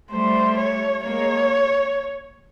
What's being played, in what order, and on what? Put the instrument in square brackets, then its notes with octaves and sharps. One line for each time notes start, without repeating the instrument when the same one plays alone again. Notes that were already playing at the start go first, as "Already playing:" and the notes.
[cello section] G3 A3 [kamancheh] C5
[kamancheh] C#5
[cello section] G#3 A#3 [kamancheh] C#5